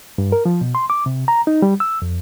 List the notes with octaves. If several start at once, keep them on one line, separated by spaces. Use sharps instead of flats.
G2
A#4
F3
B2
C6
D6
C3
A#5
D#4
G3
E6
F2